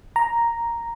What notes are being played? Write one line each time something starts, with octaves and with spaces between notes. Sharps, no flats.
A#5